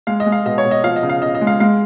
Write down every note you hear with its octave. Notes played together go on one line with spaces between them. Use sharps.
G#3 F5
D#5
G#3
F5
B2 D#5
C#5
B2
D#5
F3 F5
D#5
C#3
F5
C#3 D#5
D#5
G#3
F5
G#3 F5